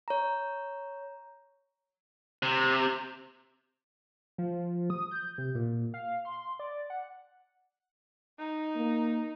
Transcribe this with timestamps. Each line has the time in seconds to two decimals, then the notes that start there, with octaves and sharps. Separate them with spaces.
0.08 C#5 A#5
2.43 C3
4.38 F3
4.90 D#6
5.11 G6
5.38 C3
5.55 A#2
5.94 F5
6.25 C6
6.59 D5
6.90 F#5
8.38 D#4
8.75 A#3